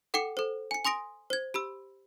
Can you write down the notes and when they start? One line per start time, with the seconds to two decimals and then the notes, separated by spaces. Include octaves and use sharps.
0.14 A4 F#5 G5 D6 C#7
0.37 A4 C5
0.71 G#5 C#7
0.85 G#5 C6 D#6 A#6 D7
1.30 C5 G#6
1.54 G4 B5 E6